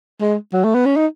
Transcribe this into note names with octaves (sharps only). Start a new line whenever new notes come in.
G#3
F#3
A3
B3
C#4
D#4